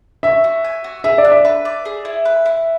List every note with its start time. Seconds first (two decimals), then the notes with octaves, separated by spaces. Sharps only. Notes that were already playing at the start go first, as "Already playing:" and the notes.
0.23 C#5 E5
0.44 F#4
0.64 G#5
0.84 F#4
1.04 G#4 E5
1.18 D5
1.24 D4
1.32 E5
1.45 B4
1.65 D5
1.85 G#4
2.05 E4
2.25 B4
2.46 E4